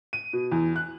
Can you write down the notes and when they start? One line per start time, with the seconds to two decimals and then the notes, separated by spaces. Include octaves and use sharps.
0.13 D#7
0.33 B2
0.52 E2
0.76 F#6